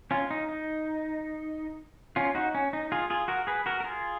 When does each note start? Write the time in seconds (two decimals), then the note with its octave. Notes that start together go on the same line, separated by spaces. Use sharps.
0.11 C#4 F4
0.31 D#4
0.49 D#4
2.16 C#4 F4
2.35 D#4 F#4
2.55 C#4
2.73 D#4
2.92 F4 G#4
3.10 F4 G#4
3.28 F#4 A#4
3.47 G#4 B4
3.66 F#4 A#4
3.80 A#4
3.84 F4 G#4